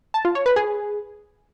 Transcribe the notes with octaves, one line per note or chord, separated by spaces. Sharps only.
A5
F4
C#5
B4
G#4